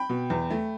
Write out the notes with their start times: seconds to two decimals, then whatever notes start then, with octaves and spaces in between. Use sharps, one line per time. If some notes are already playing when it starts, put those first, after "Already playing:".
Already playing: G5 B5
0.09 B2
0.30 E2
0.50 A3